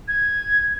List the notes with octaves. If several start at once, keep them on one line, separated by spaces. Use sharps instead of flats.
G#6